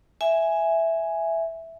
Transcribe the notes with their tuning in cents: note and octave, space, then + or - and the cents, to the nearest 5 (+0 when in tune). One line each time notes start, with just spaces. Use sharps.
E5 +0 G#5 +0